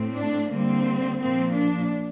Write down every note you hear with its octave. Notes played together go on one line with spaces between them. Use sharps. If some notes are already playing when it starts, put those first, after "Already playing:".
Already playing: A2 A3 C4
D4
D3 G3 A#3 C4
A#2 F3 A#3 C4
D4